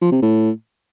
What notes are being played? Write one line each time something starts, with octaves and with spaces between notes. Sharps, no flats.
F3
C3
A2